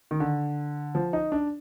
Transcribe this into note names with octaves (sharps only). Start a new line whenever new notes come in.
D#3
D3
F3
D#4
D4